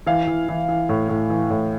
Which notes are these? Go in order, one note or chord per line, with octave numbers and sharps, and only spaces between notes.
E3 F5
E3
E3
E3
A2
A2
E3
A2